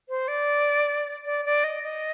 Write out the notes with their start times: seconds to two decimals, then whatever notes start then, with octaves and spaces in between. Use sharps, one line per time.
0.09 C5
0.28 D5
1.25 D5
1.45 D5
1.64 D#5
1.83 D#5